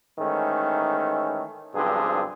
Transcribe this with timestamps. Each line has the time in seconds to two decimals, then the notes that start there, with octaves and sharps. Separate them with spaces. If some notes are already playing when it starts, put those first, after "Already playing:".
0.19 G#2 D#3 E3 A3 C#4
1.74 B1 G2 D3 F3 C4 G#4